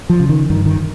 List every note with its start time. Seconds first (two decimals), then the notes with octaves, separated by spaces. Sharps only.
0.10 F3
0.20 C#3
0.29 D#3
0.50 G2 D#3
0.66 D#3